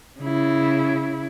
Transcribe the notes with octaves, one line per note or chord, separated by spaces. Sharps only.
C#3 E4